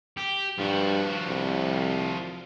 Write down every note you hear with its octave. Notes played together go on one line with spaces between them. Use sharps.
G4
G2 F3 F#4
C2